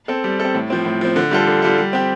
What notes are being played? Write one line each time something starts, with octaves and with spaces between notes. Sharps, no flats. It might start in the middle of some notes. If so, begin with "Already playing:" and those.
C4 A4
G3
C4 A4
A2
F3 C4
A2
F3 C4
D3
G3 F4 A4
D3
G3 F4 A4
G3
C4 G4